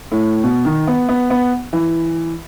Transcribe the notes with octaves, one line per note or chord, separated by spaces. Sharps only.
A2
B2
D#3
B3
B3
B3
E3